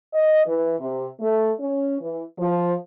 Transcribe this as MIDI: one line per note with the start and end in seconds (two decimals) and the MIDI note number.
0.14 0.44 75
0.46 0.74 52
0.79 1.07 48
1.19 1.51 57
1.59 1.96 61
2.00 2.23 52
2.38 2.73 53